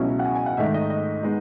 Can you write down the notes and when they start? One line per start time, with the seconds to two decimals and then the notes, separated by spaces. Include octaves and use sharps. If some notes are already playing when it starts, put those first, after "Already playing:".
Already playing: C#2 B2 F#3 C#4 E4
0.19 F#5
0.25 G#5
0.35 G#5
0.46 F#5
0.57 G#2 D#3 A3 D#4 E5
0.74 D#5
0.90 D#5
1.23 G#3 B3 D#4